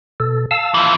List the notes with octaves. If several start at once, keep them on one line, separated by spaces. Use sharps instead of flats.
B2 A4
F5 A5 E6
E3 F3